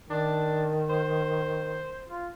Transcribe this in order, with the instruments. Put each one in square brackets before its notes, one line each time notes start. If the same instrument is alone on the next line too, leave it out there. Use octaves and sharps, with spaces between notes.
[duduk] D#3 [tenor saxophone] D4
[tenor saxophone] C5
[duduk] F4